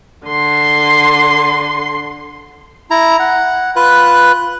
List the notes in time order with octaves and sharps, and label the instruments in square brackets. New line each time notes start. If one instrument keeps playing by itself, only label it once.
[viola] D3 C6
[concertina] E4 A#5
F#5
F4 B4 F#6